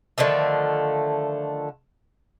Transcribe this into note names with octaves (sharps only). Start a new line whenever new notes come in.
D3 D#3 F3 A3